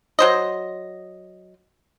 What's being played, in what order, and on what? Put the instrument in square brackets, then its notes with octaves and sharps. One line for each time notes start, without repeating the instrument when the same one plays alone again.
[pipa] F#3 C5 D#5